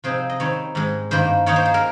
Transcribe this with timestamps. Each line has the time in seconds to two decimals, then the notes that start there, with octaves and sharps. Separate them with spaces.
0.04 C3 F3 C4 D#4 G#4
0.30 D#5
0.40 D#3 G3 C4 D#4 C#5
0.75 G#2 D#3 G#3
1.11 G2 D#3 A#3 C5
1.46 D#3 A#3 D#4 C#5
1.56 C5
1.65 G#4
1.74 A#4